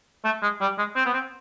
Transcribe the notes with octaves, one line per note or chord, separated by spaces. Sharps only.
A3
G#3
G3
G#3
C4
B3
C4